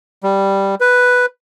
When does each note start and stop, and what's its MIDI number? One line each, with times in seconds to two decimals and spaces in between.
0.23 0.75 55
0.80 1.26 71